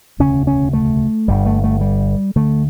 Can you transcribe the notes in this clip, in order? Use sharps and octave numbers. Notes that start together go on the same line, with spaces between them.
E1 D2 C#3 C#4
C#4
A3
G1 G2 D3 G3
A3
A3
G3
D2 D3 A3